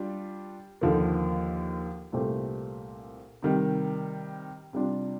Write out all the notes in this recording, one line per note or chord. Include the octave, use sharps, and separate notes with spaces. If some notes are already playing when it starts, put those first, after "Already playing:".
Already playing: G3 D4 F4
D#2 D3 F3 A#3
C2 A#2 A3 C4 G4
C3 D#3 G3
C3 G3 D4 F4